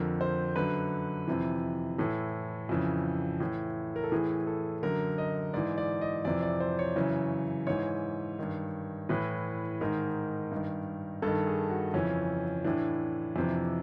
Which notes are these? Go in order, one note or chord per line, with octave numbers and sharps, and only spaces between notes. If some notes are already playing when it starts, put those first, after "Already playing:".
Already playing: F2 D3 A#4
C5
F#2 D3 B4
F2 C3 E3
A2 E3 A4
F2 C#3 E3
A2 E3
A#4
A4
A2 E3 G#4
A4
F#2 D3 A#4
D#5
G#2 E3 D5
D5
D#5
F2 C3 E3 D5
D5
C5
C#5
F#2 C#3 E3
G#2 E3 C#5
G2 D#3
A2 E3 B4
G#2 D#3 A#4
G2 D#3
G2 D#3 A4
G#4
F#4
F2 C#3 E3 C#4
A2 E3 D4
F2 C3 E3